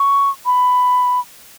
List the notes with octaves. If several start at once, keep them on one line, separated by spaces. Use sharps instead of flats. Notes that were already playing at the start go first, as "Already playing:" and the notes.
Already playing: C#6
B5